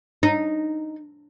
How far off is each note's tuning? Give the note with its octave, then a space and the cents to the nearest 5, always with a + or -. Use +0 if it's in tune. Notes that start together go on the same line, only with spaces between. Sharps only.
D#4 -5